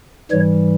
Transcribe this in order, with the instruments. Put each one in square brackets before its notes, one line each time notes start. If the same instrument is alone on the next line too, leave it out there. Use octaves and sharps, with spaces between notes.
[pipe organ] G#2 E3 G3 C#5